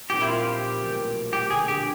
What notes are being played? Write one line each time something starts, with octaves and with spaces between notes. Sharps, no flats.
A#1 A#2 G3 C4 D#4 G4
E4
F4
G4
B1 A#2 F3 A3 C#4
G4
D2 D3 F3 G#4
G4